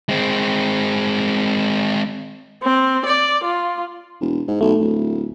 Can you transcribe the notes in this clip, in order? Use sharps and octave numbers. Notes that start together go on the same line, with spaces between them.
G#3 C4
C4
D5
F4
E1
G#2
B1 A3
D1